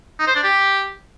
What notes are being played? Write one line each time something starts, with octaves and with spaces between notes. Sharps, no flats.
D#4
C5
D4
G4